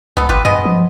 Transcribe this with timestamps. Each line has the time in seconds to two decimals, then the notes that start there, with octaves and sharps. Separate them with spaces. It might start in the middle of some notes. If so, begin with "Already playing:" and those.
0.17 C#2 B3 A4
0.29 G#1 F4 G4 B4
0.45 G2 G#3 B3 D#5
0.65 F3